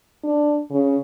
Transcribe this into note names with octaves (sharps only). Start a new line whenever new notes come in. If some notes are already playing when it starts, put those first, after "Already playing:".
D4
C#3